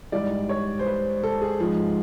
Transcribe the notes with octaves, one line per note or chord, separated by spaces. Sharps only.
G#2 E3 G3 D5
C#5
C5
B4
A4
G#4
G#2 F3